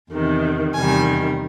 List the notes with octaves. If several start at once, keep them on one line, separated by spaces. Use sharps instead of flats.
E2 C3 D#3
E2 C3 D#3 G3 G#5